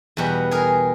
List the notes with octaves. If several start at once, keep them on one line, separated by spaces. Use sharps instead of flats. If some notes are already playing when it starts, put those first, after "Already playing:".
E2 B2 G3 F#4
G#4 A#4